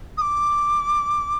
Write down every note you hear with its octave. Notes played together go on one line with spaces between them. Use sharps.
D#6
D6